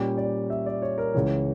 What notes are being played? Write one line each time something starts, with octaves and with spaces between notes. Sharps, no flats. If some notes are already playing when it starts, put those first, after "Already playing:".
Already playing: A#2 G3 C#4 G4
D5
E5
D5
C#5
A#4
C#2 C#3 E3 C#5